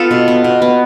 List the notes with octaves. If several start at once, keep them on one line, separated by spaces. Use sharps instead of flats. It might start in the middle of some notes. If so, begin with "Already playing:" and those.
Already playing: B3 F4 A4 B4
B2
B3
B2
B3